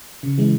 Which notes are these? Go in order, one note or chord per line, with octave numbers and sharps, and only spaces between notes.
C#3
E3 G#3